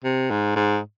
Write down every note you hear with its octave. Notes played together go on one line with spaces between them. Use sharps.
C3
G#2
G#2